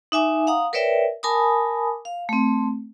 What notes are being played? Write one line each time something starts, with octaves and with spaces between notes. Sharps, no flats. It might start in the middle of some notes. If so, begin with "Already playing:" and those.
D#4 E5 G#5 D6
F5 F#5 A#5 D#6
A#4 B4 C#5 D5 E5 G5
A#4 G#5 A5 B5 D6 D#6
F5
A3 C4